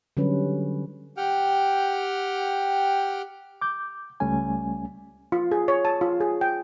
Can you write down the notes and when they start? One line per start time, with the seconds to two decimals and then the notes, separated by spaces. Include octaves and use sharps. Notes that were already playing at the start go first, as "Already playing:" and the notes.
0.17 D3 F#3 G3 C#4 B4
1.17 G4 F#5 G5 F6
3.61 D6 G6
4.20 C#2 G3 A3 C#4 G#5
5.32 F4
5.52 G#4
5.68 C#5
5.85 A5
6.01 F4
6.20 G#4
6.41 G5